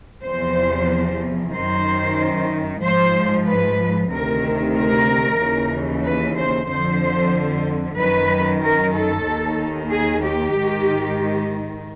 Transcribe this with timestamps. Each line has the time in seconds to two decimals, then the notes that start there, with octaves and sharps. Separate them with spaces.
0.24 E2 C3 F3 C5
1.53 F#2 D#3 C5
2.82 G#2 F3 C5
3.47 B4
4.11 D2 C3 D#3 A#4
4.76 A#4
5.40 D#2 C#3 E3
6.05 B4
6.37 C5
6.69 F2 D3 F3 C5
7.98 F#2 D#3 B4
8.63 A#4
8.95 A4
9.27 D#2 D#3
9.92 G#4
10.24 G4
10.56 G#2 D#3